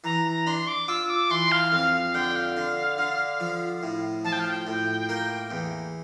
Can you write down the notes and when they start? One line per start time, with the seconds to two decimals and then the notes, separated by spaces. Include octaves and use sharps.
0.04 E3 A#5
0.25 A#5
0.47 D4 C6
0.68 D6
0.88 F4 E6
1.09 D6
1.30 E3 C6
1.52 F5
1.72 F2 F5
1.94 F5
2.14 D3 G5
2.36 F5
2.57 D3
2.98 D3
3.40 F3
3.83 A2
4.24 F3 A5
4.32 G5
4.40 F5
4.48 G5
4.67 A2
5.09 A#3
5.51 E2